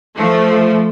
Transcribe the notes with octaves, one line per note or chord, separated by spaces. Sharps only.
F3 A3